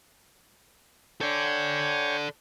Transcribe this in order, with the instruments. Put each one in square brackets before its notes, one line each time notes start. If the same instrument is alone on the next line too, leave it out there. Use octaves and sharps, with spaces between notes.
[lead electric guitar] A4 D5 [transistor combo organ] C#5 G5 G#5